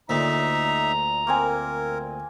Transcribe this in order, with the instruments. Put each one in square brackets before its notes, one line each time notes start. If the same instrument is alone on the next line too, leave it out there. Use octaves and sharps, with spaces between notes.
[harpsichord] D2 A#2 [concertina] D#4 E5 [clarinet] A#5
[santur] A#3 C4 G#5 [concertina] A#4